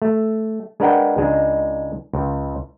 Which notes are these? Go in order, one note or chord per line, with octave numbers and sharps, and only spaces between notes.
A3
G#3 D4 A#4 B4 F#5 G5
C#2 G#3 D4 D#4
C#2